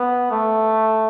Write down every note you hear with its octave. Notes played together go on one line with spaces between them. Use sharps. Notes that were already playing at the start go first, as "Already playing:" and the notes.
Already playing: B3
A3